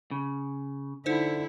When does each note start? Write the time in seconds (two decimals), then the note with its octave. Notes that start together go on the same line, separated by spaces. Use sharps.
0.11 C#3
1.06 D3 D#4 E4 C5